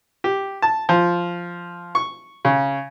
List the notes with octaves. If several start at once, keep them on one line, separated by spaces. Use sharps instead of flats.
G4
A5
F3
C#6
C#3